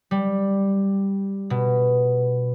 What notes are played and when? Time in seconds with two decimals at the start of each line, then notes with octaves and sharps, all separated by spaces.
0.11 G3
1.50 B2